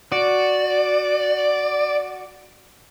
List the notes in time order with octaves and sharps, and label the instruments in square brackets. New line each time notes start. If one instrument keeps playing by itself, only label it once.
[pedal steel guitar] F#4 [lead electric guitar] D5